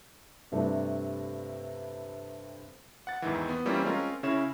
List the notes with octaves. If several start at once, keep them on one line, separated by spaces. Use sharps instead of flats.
G2 C3 G3 A3 D4
F#5 A6
E2 G#2 D#3 E3
B3
E3 G3 A#3 C4 C#4 F4
G#3 C4 C#4 F4 A#4
C#3 C#4 E4 C#5 E7